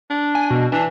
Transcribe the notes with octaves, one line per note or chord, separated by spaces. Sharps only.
D4
G#5
B2
E3 D4